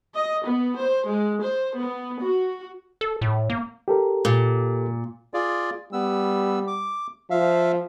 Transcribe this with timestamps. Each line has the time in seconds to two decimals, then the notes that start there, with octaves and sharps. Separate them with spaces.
0.14 D#5
0.45 B3
0.77 C5
1.07 G#3
1.41 C5
1.79 B3
2.23 F#4
3.01 A4
3.21 A2
3.50 A#3
3.88 G4 A4 A#4
4.25 A#2
5.34 F4 G#4 D5
5.93 G3 B3 E6
6.67 D6
7.30 F3 E5 F5